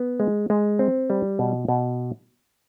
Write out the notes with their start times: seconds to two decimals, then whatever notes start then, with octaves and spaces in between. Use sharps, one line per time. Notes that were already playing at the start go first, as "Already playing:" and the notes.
Already playing: B3
0.20 G#3
0.50 G#3
0.79 C4
1.10 G3
1.39 B2
1.68 B2